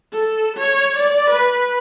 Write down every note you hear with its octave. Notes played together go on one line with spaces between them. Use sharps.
A4
C#5
D5
B4